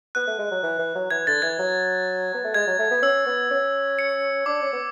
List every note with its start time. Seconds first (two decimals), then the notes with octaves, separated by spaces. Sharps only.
0.15 B3 F#6
0.27 A3
0.39 G#3
0.51 F#3
0.63 E3
0.79 E3
0.95 F#3
1.11 E3 G#6
1.27 D3 A6
1.42 E3 G#6
1.59 F#3
2.34 B3
2.44 A3
2.54 G#3 G#6
2.67 F#3
2.79 A3
2.91 B3
3.02 C#4 E6
3.26 B3
3.50 C#4
3.99 C#7
4.46 D4 D6
4.62 C#4
4.73 B3